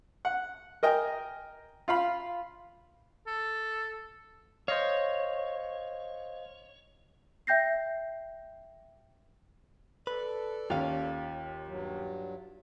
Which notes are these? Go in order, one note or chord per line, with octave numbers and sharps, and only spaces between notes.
F#5
A#4 D#5 G5 G#5
F4 F5 B5
A4
C5 C#5 D#5 F5
E5 G5 G6 A#6 C7
A4 B4 D5
D#2 C#4 F4 F5
G2 F#3